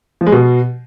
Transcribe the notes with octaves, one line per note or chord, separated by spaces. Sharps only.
F3
G#3
B2